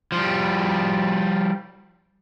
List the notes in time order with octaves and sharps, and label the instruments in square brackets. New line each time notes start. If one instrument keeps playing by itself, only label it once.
[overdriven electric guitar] F3 G3